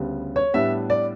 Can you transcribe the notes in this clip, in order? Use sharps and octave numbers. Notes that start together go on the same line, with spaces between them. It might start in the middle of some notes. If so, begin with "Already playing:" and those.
Already playing: D2 C#3 G3 B3
C#5
A2 G3 B3 D4 E5
D5